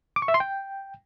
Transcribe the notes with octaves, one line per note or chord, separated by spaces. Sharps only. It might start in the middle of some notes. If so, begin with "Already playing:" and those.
D6
C#6
E5
C6
G5